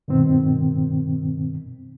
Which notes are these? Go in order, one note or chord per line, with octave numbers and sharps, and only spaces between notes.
G2 B2 D#3 C4